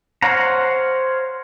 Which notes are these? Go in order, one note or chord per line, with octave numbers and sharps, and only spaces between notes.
C5 C#5 F5 F#5 A#5